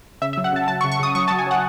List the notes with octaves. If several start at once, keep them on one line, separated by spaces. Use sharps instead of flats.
C#3 E5
E5
F#3
F#5
C#3 A5
F#3 A5
C#6
C#3
C#6
C#3 D#6
F#3 C#6
F#3 A5
G#5
F#3 F#5